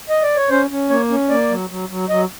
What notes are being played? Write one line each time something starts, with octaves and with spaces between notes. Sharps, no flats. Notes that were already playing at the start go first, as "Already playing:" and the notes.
D#5
D5
C#5
C#4 C5
C#4
A#3 C#5
C#4
A#3 D5
F#3
F#3
F#3
F#3 D#5